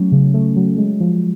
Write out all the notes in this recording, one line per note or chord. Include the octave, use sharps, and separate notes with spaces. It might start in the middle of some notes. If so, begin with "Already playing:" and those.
Already playing: F#3 A3 C#4
C#3
A3
F#3
G#3
F3